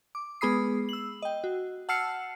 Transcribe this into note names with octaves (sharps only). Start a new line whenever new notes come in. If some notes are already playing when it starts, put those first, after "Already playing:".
D6
G#3 B3 G#4 B5 D#6 C7
E6 F#7
D#5 G5
F#4
F#5 A5 E6 F6 C7 C#7